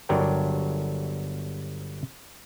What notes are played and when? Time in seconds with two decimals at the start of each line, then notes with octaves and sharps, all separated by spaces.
0.09 G1 F#3 D4 A#4 D5 G5